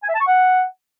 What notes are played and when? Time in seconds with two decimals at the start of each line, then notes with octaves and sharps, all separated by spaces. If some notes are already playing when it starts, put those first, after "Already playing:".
0.03 G#5
0.09 E5
0.15 A5
0.21 C#6
0.26 F#5